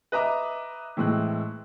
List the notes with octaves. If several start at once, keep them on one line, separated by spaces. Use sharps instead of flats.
B4 D#5 E5 A#5 D6
A2 E3 G#3 C4 F#6